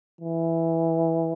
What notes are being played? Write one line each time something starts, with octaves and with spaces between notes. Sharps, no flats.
E3